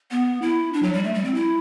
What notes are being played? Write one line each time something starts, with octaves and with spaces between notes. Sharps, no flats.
B3
E4
D4
F#3
G3
A3
G3
C4
E4